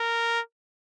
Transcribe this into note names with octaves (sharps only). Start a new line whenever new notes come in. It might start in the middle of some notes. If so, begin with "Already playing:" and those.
Already playing: A#4